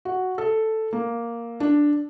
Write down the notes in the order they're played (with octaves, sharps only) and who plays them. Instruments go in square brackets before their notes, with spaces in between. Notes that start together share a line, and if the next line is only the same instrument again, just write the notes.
[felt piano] F#4
A4
A#3
D4